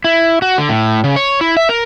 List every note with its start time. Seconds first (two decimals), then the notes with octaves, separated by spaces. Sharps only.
0.04 E4
0.42 F#4
0.58 D3
0.69 A2
1.04 C#3
1.16 C#5
1.41 E4
1.57 E5
1.69 A#4